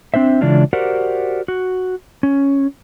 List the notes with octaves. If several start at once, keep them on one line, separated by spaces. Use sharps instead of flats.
C4 D4 C5 E5
C#3 E3 G#3 D4 E4 F4
F#4 G4 A#4 C5 D5 F#5
F#4
C#4